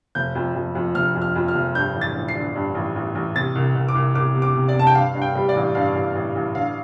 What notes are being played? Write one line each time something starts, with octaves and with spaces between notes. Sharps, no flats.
F1 G6
F2
F2
F2
F1 F6
F2
F6
F2
F6
F1
G2 G6
A1
A6
A1
C7
D3
G2
A1
A1
A1
C3 A6
C2
C2
D6
C2
C2 D6
C3
D6
C3
D5
C3 A5
G5
G2 F5
G2
G5
G3
D5
A1
G2 F5
A1
A1
A1
D3 F5